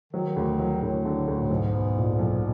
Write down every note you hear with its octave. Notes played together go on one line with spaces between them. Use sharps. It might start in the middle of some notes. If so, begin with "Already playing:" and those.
D#3 F#3
D2
F#3
D2 A2
D3
D2
A2
B1 G#2
B3
A#2
B1